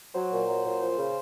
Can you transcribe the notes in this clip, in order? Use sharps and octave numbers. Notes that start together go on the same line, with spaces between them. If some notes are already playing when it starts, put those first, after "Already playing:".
F#3 C5
A#2
F#3
A#2
F3
C#3